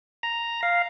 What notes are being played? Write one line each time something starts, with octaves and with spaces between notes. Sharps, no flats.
A#5
F5